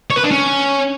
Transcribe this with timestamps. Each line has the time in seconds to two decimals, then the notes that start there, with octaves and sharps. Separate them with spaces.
0.10 C#5
0.17 B4
0.24 D4
0.31 C#4